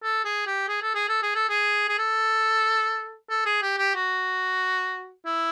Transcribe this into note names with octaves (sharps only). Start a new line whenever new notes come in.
A4
G#4
G4
G#4
A4
G#4
A4
G#4
A4
G#4
G#4
A4
A4
G#4
G4
G4
F#4
E4